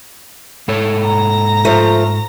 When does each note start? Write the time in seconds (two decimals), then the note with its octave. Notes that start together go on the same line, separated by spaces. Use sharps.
0.68 G#2 A4 C#5
1.05 A#5 A#6
1.65 F3 A3